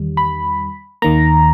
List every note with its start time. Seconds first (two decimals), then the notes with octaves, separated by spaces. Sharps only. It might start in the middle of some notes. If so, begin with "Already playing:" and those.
Already playing: E2 D#3 G3
0.17 B5
1.02 D#2 D#3 A#3 A#5